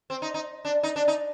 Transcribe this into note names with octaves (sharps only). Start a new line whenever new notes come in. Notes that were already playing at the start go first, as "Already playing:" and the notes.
C4
D#4
D#4
D4
D#4
D4
D#4